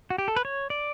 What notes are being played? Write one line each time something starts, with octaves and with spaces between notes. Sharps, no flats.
F#4
G4
A4
B4
C#5
D5